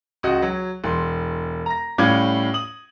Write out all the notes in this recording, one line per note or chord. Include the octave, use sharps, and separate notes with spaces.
C#2 F#4 D#5
F#3
E1 C6
A#5 A#6
A2 G3 C#4 F5 D6 G#6
D#6 F#7